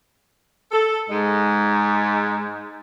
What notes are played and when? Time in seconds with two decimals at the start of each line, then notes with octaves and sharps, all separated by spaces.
0.72 A4
1.10 G#2 G#3